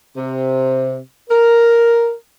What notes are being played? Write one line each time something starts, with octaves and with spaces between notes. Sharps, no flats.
C3
A#4